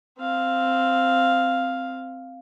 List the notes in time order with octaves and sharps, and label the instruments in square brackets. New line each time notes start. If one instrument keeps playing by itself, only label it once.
[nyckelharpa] C4 F5